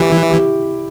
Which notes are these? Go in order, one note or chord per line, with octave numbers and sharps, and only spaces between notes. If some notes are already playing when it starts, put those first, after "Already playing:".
Already playing: E3 G4
E4
G4